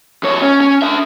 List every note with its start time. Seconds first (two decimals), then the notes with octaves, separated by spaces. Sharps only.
0.23 F2 C#5
0.42 C#4
0.61 C#4
0.82 D4 E5